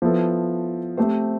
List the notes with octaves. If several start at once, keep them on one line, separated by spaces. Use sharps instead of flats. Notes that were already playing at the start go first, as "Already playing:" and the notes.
F3 B3 E4 A4
A3 C4 G4 C5